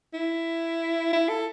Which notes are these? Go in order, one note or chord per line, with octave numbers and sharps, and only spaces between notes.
E4
E4
A4